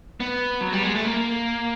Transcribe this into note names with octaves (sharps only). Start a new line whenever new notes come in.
B3
F#3
G3
G#3
A3
A#3